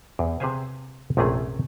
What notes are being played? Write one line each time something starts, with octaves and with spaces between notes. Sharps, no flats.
E2
C3 G#4 B4 C5 F5 G#5
A#1 F#2 C3 A3 C#4 G#4